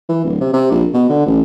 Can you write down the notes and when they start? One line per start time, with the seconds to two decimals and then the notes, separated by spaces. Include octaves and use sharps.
0.09 E3
0.25 D1
0.41 C3
0.53 C3
0.71 A#1
0.94 B2
1.10 D3
1.26 A1